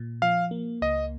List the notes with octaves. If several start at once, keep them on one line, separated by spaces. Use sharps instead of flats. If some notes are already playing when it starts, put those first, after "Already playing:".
Already playing: A#2
F3 F5
A#3
C#2 D#5